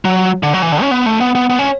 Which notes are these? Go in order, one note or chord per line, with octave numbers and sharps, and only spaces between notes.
F#3
D3
F#3
E3
D3
C#4
B3
A3
B3
B3
B3
C#4